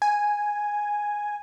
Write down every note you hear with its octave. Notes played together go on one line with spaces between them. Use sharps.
G#5